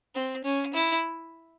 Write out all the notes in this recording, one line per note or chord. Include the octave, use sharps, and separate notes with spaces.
C4
C#4
E4